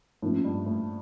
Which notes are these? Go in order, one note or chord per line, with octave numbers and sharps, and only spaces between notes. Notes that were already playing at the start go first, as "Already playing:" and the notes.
A2 F3 A#3 C#4
G2
A2